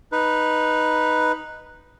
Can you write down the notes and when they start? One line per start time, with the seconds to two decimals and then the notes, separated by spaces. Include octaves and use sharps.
0.12 D#4 B4